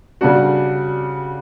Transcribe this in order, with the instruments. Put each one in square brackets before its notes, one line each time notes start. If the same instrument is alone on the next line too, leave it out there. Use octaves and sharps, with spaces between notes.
[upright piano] C#3 G3 D4 F#4